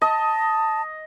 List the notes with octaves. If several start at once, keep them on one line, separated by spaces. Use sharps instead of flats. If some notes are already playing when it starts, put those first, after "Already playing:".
D#5 A5